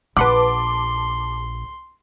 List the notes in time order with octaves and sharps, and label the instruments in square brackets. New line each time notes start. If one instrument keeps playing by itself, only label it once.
[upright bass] A#1 [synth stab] B4 F#5 B5 [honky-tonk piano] A5 D6 [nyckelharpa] C6